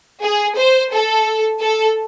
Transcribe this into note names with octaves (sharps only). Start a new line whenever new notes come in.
G#4
C5
A4
A4